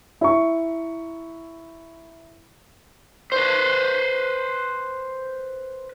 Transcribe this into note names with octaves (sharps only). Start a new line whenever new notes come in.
E4 A#5 C#6
B4 C5